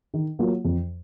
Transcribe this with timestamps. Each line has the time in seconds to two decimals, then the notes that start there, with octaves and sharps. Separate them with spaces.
0.14 D#3
0.39 F#3 A#3 F4
0.65 F2